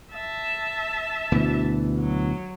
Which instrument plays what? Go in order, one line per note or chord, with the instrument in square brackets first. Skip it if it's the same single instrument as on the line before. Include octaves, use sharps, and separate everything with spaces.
[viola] E5 A5
[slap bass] D2 B2 E3
[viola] F#3